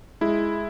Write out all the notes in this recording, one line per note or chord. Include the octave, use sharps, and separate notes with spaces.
G#3 E4